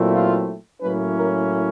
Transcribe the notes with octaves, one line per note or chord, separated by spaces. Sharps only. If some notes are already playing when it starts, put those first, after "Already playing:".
Already playing: A#2 F#3 A3 C4 E4
F4
A2 F#3 A#3 C#4 E4 B4
A#4